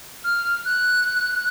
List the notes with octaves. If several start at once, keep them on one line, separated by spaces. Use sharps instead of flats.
F6
F#6